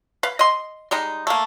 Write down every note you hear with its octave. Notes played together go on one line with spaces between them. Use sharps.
B4 F5
D#5 C6
G3 G#3 D#4
A3 A#3